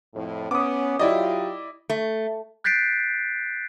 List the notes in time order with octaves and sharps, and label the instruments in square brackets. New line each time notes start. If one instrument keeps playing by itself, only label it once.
[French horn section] F2 A2
[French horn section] B3 C#4 [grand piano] D6 D#6
[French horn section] F#3 F4 G4 [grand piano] E4 D5 D#5
[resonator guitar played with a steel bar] A3
[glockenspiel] F#6 G6 A6 B6 C7 D7